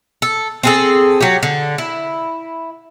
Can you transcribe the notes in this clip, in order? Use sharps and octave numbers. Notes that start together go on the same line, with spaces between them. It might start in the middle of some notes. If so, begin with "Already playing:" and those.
A4
C4 G#4 A4
F#3 G4
D3
E4